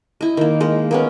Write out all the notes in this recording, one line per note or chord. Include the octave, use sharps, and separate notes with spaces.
E4 D#5
D#3 A#3
G#3 A#3
A#3 B3 C#4